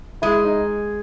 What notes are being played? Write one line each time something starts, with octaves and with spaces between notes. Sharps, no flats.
G#3 E4
D#4